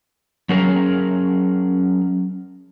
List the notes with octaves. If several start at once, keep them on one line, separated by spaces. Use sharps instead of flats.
F#3 C#4 G#4 A#4